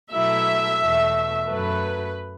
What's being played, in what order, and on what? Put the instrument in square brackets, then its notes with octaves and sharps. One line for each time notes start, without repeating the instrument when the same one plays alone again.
[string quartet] B2 F#3 A3 E4 [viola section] E5
[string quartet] E2 B2 A3
[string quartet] F#2 F#3 A3 [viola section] B4